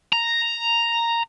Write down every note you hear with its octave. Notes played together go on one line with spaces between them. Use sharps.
A#5